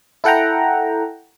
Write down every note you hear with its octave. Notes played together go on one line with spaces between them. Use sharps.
E4 A4 F#5 G5 A#5